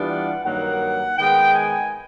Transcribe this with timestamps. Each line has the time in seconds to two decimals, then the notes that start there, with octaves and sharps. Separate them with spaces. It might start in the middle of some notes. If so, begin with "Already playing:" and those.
Already playing: E3 G3 B3 D4 F4
0.09 F#5
0.45 G2 D#3 F#3 A#3 F#5
1.18 D#3 G#3 B3 G5
1.54 G#5